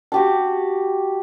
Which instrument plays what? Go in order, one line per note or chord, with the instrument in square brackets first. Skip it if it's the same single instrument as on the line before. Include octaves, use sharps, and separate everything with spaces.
[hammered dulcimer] F#4 G4 A5